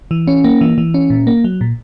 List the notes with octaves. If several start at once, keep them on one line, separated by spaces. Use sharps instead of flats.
E3
C#4
A#3
E3
E3
C#4
A#2
A#3
F#3
A#2